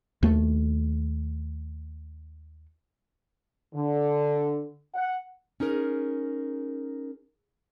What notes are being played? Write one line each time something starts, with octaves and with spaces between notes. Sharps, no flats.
D#2 A3
D3
F#5
C#4 D#4 G#4 A#4